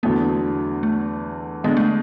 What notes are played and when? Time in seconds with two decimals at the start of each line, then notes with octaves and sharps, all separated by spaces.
0.03 E2 D3 F#3 A3 B3
0.83 A3
1.64 D3 G#3 B3 D4
1.77 A3